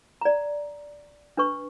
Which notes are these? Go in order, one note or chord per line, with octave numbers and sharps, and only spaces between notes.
D5 A#5
D4 B4 C#6